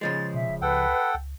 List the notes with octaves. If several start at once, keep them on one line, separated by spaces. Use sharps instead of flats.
C#3 F3 G#3 A6
B2 E5
D1
C#2 A4 B4 F#5 G5
C#2